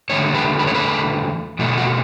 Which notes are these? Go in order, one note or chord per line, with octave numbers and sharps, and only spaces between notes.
E2 D3 A3 C#5
B4
B4
C#5
B4
E2 B2 A3
F#4